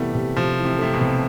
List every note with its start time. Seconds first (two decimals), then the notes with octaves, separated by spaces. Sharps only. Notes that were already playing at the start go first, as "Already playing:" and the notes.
Already playing: C3 E3 G3 A3 B3
0.14 C3
0.36 C3 F3
0.58 E3
0.65 C3
0.79 C3 A3
0.94 B2
1.01 C3